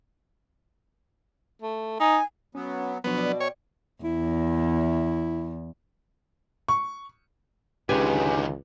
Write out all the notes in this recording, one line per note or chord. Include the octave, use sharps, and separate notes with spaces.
A3
D#4 G#5
F#3 B3 C#4
B2 F3 F#3 B3 D4 D#4 F4 C#5
D5
C#5 G5
E2 E4
C#6
C#2 D3 D#3 G#3 C#4 G4 B4 G#5